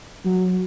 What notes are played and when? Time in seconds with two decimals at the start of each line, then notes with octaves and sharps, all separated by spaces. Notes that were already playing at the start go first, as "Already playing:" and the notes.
0.25 F#3